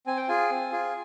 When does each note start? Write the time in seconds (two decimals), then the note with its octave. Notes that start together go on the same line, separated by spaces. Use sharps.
0.07 C4 G#5
0.17 G5
0.28 F4 G#4 G#5
0.50 C4
0.72 F4 G#4